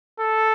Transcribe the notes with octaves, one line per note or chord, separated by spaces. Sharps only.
A4